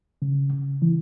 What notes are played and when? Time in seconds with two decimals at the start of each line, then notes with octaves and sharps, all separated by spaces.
0.22 C#3
0.53 C#3
0.82 E3